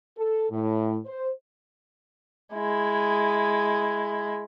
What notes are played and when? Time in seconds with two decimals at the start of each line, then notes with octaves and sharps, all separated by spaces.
0.18 A4
0.50 A2
1.06 C5
2.54 G#3 E4